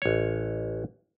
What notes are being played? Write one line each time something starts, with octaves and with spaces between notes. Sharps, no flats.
A1 C#5